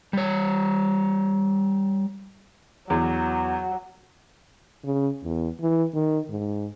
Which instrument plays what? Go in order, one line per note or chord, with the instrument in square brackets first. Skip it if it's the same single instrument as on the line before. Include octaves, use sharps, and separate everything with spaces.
[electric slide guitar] G3 C#5
[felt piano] E2 [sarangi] F#3
[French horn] C#3
E2
E3
D#3
G#2